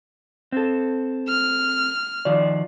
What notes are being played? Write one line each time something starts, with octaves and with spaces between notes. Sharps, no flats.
C4 A4
F6
D#3 F3 D5